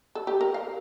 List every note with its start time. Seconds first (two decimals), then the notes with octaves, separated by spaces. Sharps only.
0.15 A4
0.27 G4
0.41 A#4
0.54 F5